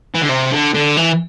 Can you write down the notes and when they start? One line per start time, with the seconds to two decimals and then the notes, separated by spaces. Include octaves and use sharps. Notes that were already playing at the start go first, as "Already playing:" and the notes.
0.15 E3
0.22 D3
0.29 C3
0.51 D3
0.74 D3
0.97 E3